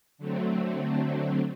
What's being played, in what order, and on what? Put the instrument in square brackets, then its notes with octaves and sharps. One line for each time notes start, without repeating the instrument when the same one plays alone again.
[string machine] D3 F#3 A3 C4